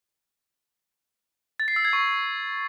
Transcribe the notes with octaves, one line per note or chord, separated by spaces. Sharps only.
A6
C7
E6
G#6
C#6